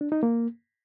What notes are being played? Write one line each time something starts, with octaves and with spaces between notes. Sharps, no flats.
D4
D#4
A#3